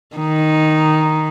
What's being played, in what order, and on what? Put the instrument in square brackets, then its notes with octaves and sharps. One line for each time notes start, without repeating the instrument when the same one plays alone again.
[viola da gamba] D#3 D#4